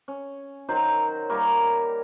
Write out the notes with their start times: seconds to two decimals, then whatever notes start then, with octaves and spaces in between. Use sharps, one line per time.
0.08 C#4
0.69 D#3 F#3 C5 A#5
1.29 G3 A#3 A#4 C#5